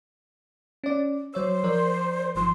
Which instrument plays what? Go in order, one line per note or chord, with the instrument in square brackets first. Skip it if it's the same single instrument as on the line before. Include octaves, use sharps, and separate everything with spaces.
[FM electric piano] C#4 D5
[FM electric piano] F#3 C#5 E6 [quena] C5
[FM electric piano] F3 A#4 D5
[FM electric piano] G1 F3 [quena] C6